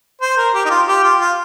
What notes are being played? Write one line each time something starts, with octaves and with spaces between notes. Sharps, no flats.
C5
A#4
G4
D#4
F4
G4
F4
F4